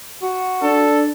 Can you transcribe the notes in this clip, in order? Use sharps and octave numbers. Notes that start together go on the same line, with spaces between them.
F#4
D4 A4